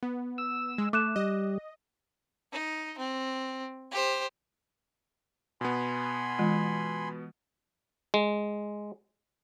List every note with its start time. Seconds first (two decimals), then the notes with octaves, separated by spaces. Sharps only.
0.03 B3
0.38 E6
0.78 G#3
0.93 A3 D6 F#6 E7
1.16 G3 D#5
2.52 D#4
2.98 C4
3.91 G4 C5
5.61 B2 B3 G#5 B5 C6
6.39 E3 G#3 F4
8.14 G#3